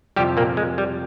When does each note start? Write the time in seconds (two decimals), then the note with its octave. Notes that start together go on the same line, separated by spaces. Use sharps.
0.16 F2 C3 F3 G3 G4
0.37 A#2 A#3
0.57 G#3
0.78 G3